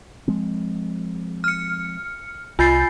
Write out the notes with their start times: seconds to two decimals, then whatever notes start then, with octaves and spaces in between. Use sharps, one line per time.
0.28 F3 G#3 C4
1.44 F6 C#7
2.59 C2 F4 G#5 B5 G6 A6 C7